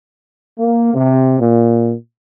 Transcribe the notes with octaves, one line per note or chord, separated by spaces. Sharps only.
A#3
C3
A#2